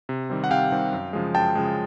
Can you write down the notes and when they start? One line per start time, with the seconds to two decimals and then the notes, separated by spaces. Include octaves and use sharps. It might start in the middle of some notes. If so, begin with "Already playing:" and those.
0.09 C3
0.30 D#3 G3 C4
0.44 F#5
0.51 C3 F5 G5
0.72 D#3 G3 C4
0.93 F#2
1.13 C#3 F3 G#3
1.35 F#2 G5 A5
1.55 C#3 F3 G#3